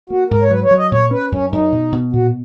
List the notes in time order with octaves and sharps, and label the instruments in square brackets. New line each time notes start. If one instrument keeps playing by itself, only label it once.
[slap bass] A#3 [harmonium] F#4
[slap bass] G#2 [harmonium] A#4
[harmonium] C#5
[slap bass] F#3 [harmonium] B4
[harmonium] C#5
[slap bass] F#3
[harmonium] D#5
[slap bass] A#2 [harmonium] C#5
[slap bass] C#4 [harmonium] B4
[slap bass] F#2 [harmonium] C#4
[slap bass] F#2 [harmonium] D#4
[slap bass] B2
B2
[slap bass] A#2 [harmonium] F#4